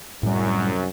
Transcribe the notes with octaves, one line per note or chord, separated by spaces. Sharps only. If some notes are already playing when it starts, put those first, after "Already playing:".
C2 F#2 A2 G3